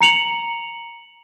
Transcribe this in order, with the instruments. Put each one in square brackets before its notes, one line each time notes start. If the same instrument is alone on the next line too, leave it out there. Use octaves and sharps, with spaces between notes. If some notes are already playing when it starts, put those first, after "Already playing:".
[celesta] A#5 C#7 F7 F#7